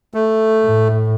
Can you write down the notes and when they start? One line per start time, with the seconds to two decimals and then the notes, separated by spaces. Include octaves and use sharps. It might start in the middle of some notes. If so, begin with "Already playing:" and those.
0.14 A3
0.64 A2